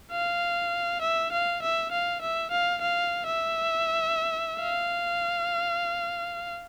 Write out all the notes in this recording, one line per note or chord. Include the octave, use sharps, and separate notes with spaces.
F5
E5
F5
E5
F5
E5
F5
F5
E5
F5